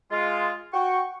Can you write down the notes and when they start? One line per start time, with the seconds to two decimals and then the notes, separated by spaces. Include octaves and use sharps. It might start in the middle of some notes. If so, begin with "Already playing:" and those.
0.11 G#3 F4
0.73 F#4 G5 C#6